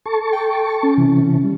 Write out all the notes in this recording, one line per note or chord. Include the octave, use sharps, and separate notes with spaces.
A4 A5 C#6
G5
C#4
C3 E3
G3